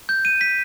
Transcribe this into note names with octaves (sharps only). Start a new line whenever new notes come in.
G6
D#7
B6